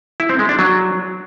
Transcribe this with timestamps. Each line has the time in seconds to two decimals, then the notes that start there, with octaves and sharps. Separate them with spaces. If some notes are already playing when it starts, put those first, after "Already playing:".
0.20 E4
0.29 C4
0.39 G#3
0.49 D4
0.59 F#3